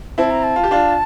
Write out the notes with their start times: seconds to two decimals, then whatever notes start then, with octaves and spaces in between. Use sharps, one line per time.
0.18 C4 E4 A5
0.30 A#5
0.43 A5
0.56 F4
0.64 G4
0.71 D4 F4